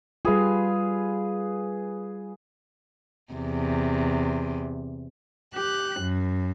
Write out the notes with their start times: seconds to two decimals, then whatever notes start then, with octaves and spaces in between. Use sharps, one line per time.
0.25 G3 F4 G#4 B4 F5
3.33 E2 C3
5.54 G4 F#6
5.99 F#2